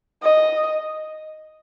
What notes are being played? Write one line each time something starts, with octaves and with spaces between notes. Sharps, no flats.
D#5